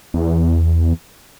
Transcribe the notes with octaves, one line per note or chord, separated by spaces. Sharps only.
E2